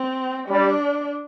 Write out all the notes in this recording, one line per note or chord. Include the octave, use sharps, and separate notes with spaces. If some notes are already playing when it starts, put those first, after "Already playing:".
Already playing: C4
G3 D4